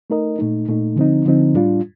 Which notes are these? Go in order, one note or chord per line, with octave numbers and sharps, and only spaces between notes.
A3 D#4 A#4 D#5
A#2 A3 D#4
A#2 A3 D#4
D3 F3 C4 D#4
D3 F3 C4 D#4
A2 G3 D4 F4